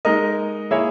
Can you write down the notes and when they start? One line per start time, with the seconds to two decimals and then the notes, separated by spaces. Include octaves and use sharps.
0.05 G#3 D#4 A#4 D#5
0.71 A#3 E4 G#4 C#5 E5